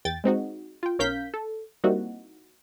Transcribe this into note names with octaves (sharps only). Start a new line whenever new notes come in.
E2 G5 A6
G#3 C4 D#4 F#4
F4 G5
B1 C#4 A#4 F5 G6 B6
A4
G3 A#3 C4 D#4 E4 F#4